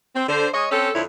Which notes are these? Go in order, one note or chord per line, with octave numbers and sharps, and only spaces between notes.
C4
D3 C5
G#3 C#5 D#5
C4 C#4 A4
F2 D3 C4 E4 C#5